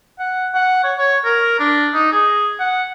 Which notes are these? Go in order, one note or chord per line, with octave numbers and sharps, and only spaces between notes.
F#5
F#5
C#5
C#5
A#4
D4
D#4
G#4
F#5